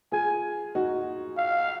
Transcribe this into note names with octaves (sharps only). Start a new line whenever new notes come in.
F4 G#4 G#5
D#4 F#4
F5